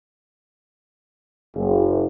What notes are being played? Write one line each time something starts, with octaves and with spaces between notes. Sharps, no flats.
F#1